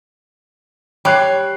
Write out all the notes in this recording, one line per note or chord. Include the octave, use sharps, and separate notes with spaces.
G3 C#5 F#6 C7